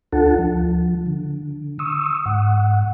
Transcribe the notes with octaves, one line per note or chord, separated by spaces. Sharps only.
D2 D4 F4 A4 F#5 A5
F3
D3
C#6 D#6 E6
G#2 F#5